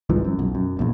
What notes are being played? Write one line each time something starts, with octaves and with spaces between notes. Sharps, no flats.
C2 G#2 E3 F3
F#2
B1
F#2
E1 A#1 E2